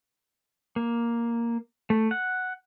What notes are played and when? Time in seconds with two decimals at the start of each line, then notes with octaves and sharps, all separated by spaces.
0.76 A#3
1.90 A3
2.11 F#5